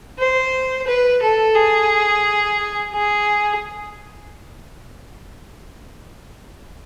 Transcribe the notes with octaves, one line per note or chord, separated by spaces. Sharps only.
C5
B4
A4
G#4
G#4